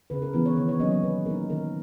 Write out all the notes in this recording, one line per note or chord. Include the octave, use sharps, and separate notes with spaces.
C#3 B4
A#4
E3 B3 B4
C#5
D#3 C#5
C#5
F#3 A#3 C#4 D#5
C#5
A#2 B4
A#3 D#4 A#4
D#3 A#4